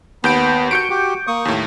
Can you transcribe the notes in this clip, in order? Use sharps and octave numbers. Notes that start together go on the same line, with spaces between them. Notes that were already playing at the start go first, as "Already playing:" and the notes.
D#2 B3 G6 D7
F#4 G6 C#7 D7
F#4 G4
A#3 C#6 D#6
D#2 A2